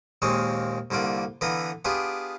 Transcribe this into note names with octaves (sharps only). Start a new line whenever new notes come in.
D#2 A#2 G#3 C4 G#4 C#6
C2 D3 A#3 F4 D5
D3 E3 B3 B4 F5 A#5
B3 D4 F4 G4 G#4